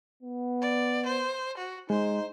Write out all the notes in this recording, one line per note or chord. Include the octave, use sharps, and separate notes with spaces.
B3
D5
C5
F#4
G#3 D#4 C5